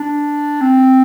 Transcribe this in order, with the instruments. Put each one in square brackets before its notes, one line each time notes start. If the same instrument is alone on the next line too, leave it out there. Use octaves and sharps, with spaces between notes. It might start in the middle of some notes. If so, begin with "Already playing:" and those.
Already playing: [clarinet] D4
C4